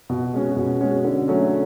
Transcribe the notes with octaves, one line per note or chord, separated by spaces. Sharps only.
B2
G#3 C#4 F#4
B2
G#3 C#4 F#4
D3
F#3 A3 C#4